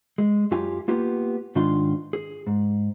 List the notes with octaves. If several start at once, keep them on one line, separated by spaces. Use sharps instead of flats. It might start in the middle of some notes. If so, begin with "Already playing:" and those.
G#3
F#2 F#3 F4 G4 F5 G#5
A#3 B3 F4 G4
G#2 D#3 D4 F4 F5 C6
G#4
G#2